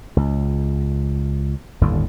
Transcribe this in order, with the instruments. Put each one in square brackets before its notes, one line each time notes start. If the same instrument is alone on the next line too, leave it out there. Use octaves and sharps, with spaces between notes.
[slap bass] C#2
G1 D#2 A2 D3